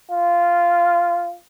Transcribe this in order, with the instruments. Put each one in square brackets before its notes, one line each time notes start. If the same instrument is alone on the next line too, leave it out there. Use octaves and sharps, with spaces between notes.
[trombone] F4